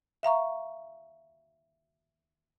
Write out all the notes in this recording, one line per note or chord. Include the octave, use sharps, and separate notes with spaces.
E5 F5 A#5 C#6